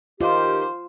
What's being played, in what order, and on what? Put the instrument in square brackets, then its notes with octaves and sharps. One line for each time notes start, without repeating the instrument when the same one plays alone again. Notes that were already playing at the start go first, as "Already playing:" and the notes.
[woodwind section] D#3 G4 [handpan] F4 [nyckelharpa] C5